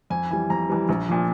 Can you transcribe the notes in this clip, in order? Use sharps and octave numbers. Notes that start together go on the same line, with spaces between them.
F2 G#5
E3 G3 G#5
F2 A#5
E3 G3
A#1
A#2 F3